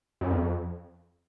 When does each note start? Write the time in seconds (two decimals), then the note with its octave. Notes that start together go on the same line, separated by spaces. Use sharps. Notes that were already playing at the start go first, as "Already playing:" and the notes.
0.21 F#2
0.31 F2